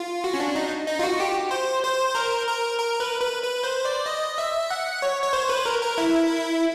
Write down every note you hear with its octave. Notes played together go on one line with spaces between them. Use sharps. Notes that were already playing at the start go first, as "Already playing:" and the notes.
Already playing: F4
F#4
C#4
D4
D#4
D#4
F4
F#4
G4
C5
C5
A#4
A#4
A#4
B4
B4
B4
C5
D5
D#5
E5
F#5
C#5
C#5
C5
B4
A#4
A#4
E4